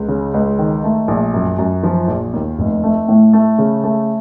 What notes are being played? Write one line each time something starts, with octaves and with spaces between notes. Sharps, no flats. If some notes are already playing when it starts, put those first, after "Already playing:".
Already playing: C#2
C#3
C#2
D#3
A3
A#1
F#2
F#2
F3
A#1
D#2
F1
A3
A2
A3
C#3
A3